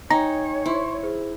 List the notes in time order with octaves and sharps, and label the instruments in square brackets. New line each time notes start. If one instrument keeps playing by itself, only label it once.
[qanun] D#4 [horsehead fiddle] C#5 [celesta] G5 G#5 [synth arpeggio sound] A#5
[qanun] E4 [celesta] C5 C6 C#6
[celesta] G#4 C5